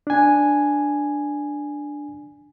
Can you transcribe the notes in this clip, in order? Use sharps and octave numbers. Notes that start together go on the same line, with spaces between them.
D4 G#5